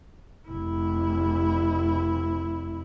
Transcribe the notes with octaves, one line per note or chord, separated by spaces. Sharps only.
F1 E4